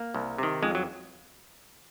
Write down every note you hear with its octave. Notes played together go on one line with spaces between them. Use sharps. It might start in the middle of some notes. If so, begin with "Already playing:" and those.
Already playing: A#3
C2
C3 D#3
F2 G#3
F#3